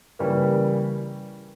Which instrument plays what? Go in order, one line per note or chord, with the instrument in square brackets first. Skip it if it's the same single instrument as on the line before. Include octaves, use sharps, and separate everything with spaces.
[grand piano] C#3 E3 G3 A#3